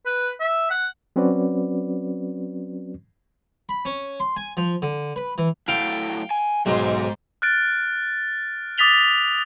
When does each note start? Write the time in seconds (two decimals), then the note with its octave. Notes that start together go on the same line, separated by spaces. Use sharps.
0.06 B4
0.41 E5
0.71 F#5
1.16 F#3 C4 C#4 F#4 B4 D5
3.69 B5
3.85 C#4
4.20 C6
4.37 G#5
4.57 F3
4.82 D3
5.16 B4
5.38 E3
5.68 F#3 A3 E4 F5 G5
6.31 G#5
6.66 B1 G#2 G#3 C5
7.42 F6 F#6 A6 D7
8.78 D6 D#6 A6 B6 F7 G7